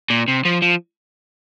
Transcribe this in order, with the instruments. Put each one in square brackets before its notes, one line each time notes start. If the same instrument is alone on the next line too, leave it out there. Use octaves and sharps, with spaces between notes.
[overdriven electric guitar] A#2
C3
F3
F3